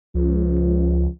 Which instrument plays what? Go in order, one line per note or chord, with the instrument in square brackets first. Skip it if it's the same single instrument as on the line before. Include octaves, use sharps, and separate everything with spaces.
[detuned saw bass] C#2 [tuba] F3